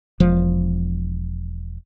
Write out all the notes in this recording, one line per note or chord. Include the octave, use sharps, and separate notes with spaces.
E1 F3